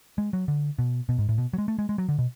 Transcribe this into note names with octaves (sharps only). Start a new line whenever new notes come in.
G#3
F#3
D3
B2
B2
G#2
A2
B2
F#3
G#3
A3
G#3
G#3
F#3
D3
B2